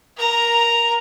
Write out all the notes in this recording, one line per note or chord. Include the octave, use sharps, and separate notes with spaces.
A#4 A#5